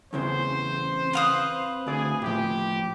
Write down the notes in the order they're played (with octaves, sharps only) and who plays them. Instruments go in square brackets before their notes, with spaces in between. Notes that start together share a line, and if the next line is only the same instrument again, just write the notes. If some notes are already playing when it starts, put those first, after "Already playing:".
[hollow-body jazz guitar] E2 C#3 E3 [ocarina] C4 [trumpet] C5
[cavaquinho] B4 F5 D#6
[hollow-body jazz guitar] D2 D5 [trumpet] G#4
[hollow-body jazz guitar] A2 F3 [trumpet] G4